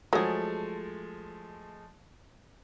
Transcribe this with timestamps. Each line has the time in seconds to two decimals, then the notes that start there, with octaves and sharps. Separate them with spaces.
0.13 F3 F#3 G#3 A3 G#4